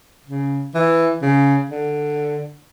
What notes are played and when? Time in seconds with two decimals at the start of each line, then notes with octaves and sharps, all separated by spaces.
0.26 C#3
0.74 E3
1.22 C#3
1.70 D3